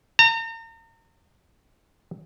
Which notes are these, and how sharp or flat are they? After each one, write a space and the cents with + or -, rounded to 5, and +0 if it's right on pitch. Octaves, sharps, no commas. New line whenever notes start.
A#5 -40